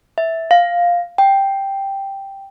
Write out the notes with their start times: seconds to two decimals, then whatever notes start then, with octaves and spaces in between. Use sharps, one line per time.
0.18 E5
0.51 F5
1.18 G5